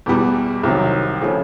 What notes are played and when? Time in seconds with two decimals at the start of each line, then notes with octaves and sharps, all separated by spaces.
0.06 E2 B2 G3 B3
0.63 C2 C3 D#3 F#3
1.21 C#3 F3 A3 C#4